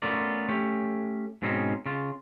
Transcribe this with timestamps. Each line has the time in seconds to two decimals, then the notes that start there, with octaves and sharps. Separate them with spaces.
0.02 A3 B3 C#4 F4 A#4 D5
0.49 A3 C#4 G4
1.42 G#2 B2 C4 C#4 D#4
1.86 C#3 F4